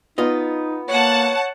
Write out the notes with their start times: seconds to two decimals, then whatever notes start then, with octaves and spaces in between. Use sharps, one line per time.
0.18 B3 D#4 F4 D#5
0.89 A#3 C#5 F#5 A5